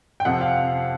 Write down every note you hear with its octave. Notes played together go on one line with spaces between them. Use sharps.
G5
F2 C3 F3 F#5
F5